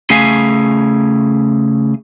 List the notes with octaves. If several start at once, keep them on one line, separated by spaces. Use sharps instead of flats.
C#3 A3 G#4 E5 F5 G#5